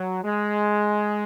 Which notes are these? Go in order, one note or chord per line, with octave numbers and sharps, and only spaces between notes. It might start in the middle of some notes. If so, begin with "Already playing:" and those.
Already playing: F#3
G#3